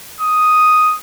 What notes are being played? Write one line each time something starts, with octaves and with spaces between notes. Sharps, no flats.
D#6